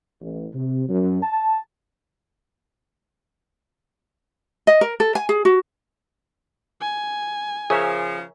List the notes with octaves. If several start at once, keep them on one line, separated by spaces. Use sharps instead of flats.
A1
C3
F#2
A5
D#5
A#4
A4
G#5
G#4
F#4
G#5
C#3 F3 G#4 A#4 C#5 E5